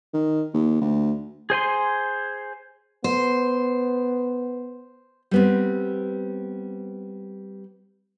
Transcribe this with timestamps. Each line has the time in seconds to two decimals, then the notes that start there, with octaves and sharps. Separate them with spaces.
0.13 D#3
0.54 D#2
0.81 D2
1.50 G#4 C5 G#5 C6
3.04 B3 C5
5.31 G3 B3 C4